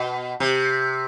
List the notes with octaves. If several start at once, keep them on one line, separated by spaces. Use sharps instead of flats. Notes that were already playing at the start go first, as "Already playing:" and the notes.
Already playing: B2
C3